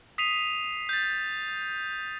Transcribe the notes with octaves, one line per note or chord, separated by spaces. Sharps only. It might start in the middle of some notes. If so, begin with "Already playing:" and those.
D#6 B6 C7 D#7 F7
G6 A6